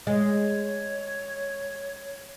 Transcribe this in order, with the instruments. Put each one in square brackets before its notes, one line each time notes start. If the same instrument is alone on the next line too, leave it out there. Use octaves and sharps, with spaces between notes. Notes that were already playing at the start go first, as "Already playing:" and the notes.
[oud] G#3 [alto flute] C#5